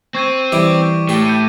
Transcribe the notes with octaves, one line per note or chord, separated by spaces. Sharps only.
C4 C#6 G#6 D#7
E3 G3 E4 D6 D7
A2 G4
G6 C#7 D#7